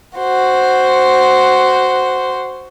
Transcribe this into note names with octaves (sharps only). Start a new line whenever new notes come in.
F#4 C5